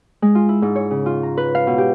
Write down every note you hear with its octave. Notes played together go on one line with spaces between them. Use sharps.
G#3
F4
E4
G#2
C#5
C#3
F4
A#5
B4
F5
B2
G4